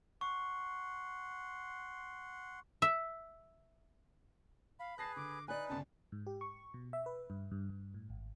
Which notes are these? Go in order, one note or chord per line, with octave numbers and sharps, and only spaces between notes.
F#5 C6 C#6
E5
F5 B5
G#4 B4 A5 F#6 A#6 C7
D3 D6
D#4 B4 D5 G#5 F#6
G1 C#2 F#2 A5
G#2
G4
C#6
B2
E5
B4
G2
G2
G2
A2
G#1